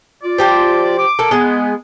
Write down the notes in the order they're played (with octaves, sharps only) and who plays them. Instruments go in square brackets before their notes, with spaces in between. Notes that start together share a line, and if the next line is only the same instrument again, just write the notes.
[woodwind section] F4 D5
[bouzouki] F3 G4 C5
[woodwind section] D6
[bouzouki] A#3 A4
[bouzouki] G#3 [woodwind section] B3